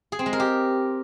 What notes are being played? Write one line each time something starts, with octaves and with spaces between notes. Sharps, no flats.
G#4
C4
G#3
A#4
G4